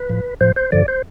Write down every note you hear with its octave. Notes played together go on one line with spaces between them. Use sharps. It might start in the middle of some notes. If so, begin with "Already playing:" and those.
Already playing: B4
A2 F3
A2 F3 C5
C5
G2 D3 F3 D5
C5